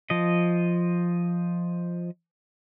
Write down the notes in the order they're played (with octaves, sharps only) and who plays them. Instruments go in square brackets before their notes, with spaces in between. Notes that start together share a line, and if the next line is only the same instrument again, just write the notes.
[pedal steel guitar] F3 D#5